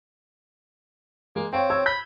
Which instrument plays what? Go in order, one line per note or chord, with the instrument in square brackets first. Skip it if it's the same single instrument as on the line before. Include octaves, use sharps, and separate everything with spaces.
[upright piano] G#3 [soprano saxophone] A#3
[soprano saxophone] C4 [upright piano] C#5 F5 G5
[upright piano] C#5 E6 G#6
[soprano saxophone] B5 [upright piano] G6